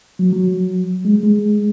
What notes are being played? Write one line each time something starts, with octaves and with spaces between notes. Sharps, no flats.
F#3
F#3
G#3
G#3